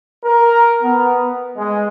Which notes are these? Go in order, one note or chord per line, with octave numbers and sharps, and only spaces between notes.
A#4
B3
G#3